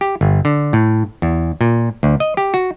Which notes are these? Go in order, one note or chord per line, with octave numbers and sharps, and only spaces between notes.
G4
G1
D3
A2
E2
A#2
D2
D#5
G4
F#4